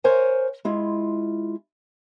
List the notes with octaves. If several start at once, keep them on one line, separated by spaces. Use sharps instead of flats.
A#4 C5 C#5 G#5
G#3 E4 F4